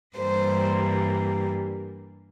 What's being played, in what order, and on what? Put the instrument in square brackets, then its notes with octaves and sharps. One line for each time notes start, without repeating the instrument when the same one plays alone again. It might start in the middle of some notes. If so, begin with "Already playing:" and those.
[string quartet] G2 E3 G3 A#3 C5